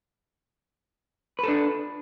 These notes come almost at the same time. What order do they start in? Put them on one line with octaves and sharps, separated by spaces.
B4 A4 D4